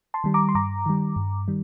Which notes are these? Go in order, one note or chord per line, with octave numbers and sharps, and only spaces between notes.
A5 C6
D#3 G3
A#5 D6
C6
G2 A#5 D6
D#3 G3
G2
D#3 G3